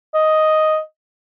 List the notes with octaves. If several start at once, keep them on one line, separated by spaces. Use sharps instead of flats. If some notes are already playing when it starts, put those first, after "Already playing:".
D#5